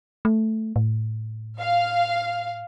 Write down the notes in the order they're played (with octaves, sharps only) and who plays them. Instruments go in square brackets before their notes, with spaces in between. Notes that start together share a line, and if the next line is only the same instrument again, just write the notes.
[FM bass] A3
A2
[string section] F5